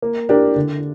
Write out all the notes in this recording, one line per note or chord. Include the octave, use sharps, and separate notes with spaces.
A#3
D4 G4 A#4
D3